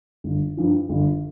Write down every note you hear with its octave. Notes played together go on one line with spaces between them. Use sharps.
G1
G2 F3
G1